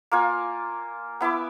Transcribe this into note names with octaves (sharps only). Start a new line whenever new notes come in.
A#3 F4 G#5
B3 E4 E5 D6